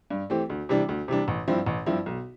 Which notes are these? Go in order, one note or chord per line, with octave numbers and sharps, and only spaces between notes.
G2
E3 A3 C4 G4
D2
C3 E3 G3 D4
D2
C3 E3 G3 D4
A1
G2 F3 C4 E4
A1
G2 F3 C4 E4
B1